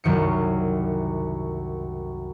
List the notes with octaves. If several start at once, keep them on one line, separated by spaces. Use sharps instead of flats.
C2 F#2 D#3 C#7